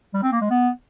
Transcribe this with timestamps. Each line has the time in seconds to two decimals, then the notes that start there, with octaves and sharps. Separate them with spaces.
0.14 G3
0.23 C4
0.32 A#3
0.41 G#3
0.50 B3